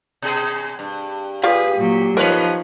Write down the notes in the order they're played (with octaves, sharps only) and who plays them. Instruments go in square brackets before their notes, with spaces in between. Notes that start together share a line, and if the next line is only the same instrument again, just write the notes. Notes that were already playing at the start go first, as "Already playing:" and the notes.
[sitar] B2 G#4
G2
[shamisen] F4 D5 F5 [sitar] G4 [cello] G#4 B4
[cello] A#2 F#3
[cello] F3 D#4 [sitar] B3 B4 C#5 [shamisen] A#4